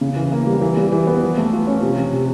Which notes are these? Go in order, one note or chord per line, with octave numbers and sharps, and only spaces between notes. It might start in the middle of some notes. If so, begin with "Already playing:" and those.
C#3
E3
A#3
G3
E3
G3
E3
B3
F3
A3
F4
C#4
C3
F3
C3